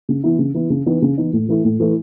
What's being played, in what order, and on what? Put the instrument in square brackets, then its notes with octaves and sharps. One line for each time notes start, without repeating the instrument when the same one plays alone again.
[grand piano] C#3
E3 B3 E4
C#3
E3 B3 E4
C#3
E3 B3 D#4
C#3
E3 B3 D#4
A2
E3 A3 E4
A2
E3 A3 E4